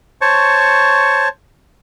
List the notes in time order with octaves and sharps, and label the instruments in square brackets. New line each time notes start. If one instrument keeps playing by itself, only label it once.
[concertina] C5 C#5 A5 C#6